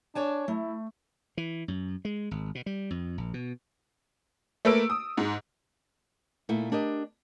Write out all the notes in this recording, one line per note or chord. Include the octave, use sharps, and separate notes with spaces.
D4 C#5 G#5 A5
A3 E4
E3
F#2
G#3
G#1
B2
G3
F2
A#1
B2
A3 A#3 B4 E6 D7
D#6
G#2
A#2 A3 D#4 E4
D4 G4 A#4 D#5